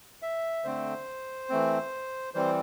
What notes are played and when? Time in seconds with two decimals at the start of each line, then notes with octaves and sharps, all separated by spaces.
0.22 E5
0.65 D3 A3 C4 C5
1.49 E3 A3 C4
2.34 E3 G3 C4 C5